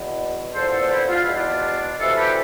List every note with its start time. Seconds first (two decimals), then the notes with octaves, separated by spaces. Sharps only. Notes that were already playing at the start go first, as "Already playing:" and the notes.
Already playing: E2 B2
0.53 E2 D3 F3 A4 C5
0.71 A4 C5
0.83 D4
0.90 C4 E4
1.08 F4
1.21 E4
1.26 E2 B2
1.33 D4 F4
1.99 D2 C3 E3 F4 A4
2.17 G4 B4